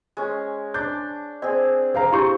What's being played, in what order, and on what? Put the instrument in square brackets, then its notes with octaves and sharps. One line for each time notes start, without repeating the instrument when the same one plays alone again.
[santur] G#3 C#4
[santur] D4 [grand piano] G6
[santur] C4 G#4 [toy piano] D5
[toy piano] G#4 [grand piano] C5 F5 A#5 [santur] G5
[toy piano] E4 G4 [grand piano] C6 C#6 G6